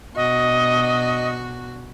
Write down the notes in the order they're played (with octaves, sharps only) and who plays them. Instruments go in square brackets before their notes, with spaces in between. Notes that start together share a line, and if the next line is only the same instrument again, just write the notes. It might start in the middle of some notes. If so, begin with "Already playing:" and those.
[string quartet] B2 D4 F#4 [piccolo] D#5